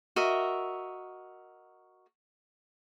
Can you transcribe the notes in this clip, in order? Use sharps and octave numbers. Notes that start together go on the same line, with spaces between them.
F#4 A#4 D#5 E5